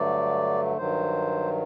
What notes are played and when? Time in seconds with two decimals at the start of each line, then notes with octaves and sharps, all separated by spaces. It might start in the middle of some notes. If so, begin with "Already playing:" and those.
Already playing: G2 D3 F#3 A3 D5
0.77 G2 D#3 F#3 C5